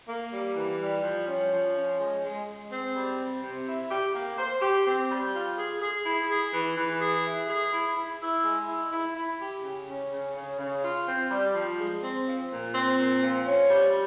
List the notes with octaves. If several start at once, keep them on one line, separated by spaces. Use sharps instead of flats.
A#3
G3
E3
G3
F3
C#4
F3
C#4
G#3
G#3
G#3
C4
G3
C3
C3
E4
G4
A#3
C5
G4
C4
G3
F4
G#4
G#4
E4
G#4
E3
E3
G#4
E4
G#4
E4
E4
E4
G#3
E4
E4
E4
G4
C#3
C#4
C#3
C#3
C#3
F4
C4
G3
F3
G#3
C4
F3
A#2
C4
A#2
F3
C#4
G3